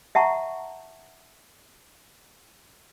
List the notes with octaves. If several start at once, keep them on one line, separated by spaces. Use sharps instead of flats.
E5 F#5 A5 A#5 C#6